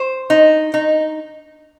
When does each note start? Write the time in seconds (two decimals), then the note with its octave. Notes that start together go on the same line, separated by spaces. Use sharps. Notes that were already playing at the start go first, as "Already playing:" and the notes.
Already playing: C5
0.30 D#4
0.74 D#4